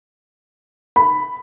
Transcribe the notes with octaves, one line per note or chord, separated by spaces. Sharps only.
B5